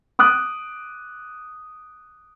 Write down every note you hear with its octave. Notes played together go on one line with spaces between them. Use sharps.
D6 D#6 F#6 D7